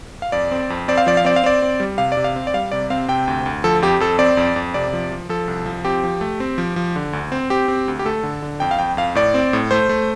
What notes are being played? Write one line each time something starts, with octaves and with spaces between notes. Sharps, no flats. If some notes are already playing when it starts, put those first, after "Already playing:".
F5
F2 D5
C4
F2
C4 D5
F5
F3 D5
F5
C4 D5
F5
C4 D5
C4
G3
C3 F5
D5
C3
F5
C4
D5
G3 F5
C3 D5
C4 F5
C3 G5
D2
D2
F3 A4
F2 G4
F2 A4
C4 D5
F2
F2
C3 D5
F3
F3
F3 A4
C2
F3
C4 G4
F3
A3
C4
F3
F3
D3
D2
C4
C4 G4
C4
D2
G4
A3 A4
D3
D3
F2 G5
F5
F2 G5
F2 F5
A2 D5
C4
A2
A3 C5
A3